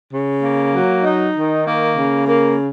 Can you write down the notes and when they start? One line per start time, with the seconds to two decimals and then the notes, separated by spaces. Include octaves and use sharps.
0.10 C#3
0.41 A#3
0.72 F#3
1.03 D#4
1.35 D#3
1.65 A#3
1.96 C#3
2.27 A#3